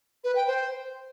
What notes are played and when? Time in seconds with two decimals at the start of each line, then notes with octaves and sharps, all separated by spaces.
0.24 B4
0.36 G5
0.47 C5